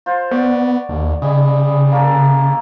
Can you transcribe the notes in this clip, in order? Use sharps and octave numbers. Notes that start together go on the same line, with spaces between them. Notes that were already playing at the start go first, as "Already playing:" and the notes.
F4 C5
B3 C#5 D5 F#5
D#2
C#3 G3 G#4 D#5
A#3 C#4 A4